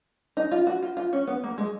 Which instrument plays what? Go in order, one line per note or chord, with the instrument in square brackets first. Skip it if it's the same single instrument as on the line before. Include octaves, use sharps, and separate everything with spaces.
[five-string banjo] D#4
F4
F#4
F4
F4
C#4
B3
A#3
G#3